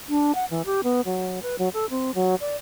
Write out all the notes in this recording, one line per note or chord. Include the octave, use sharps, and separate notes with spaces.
D4
F#5
E3
G4
B3
F#3
B4
F#3
A4
C4
F#3
D5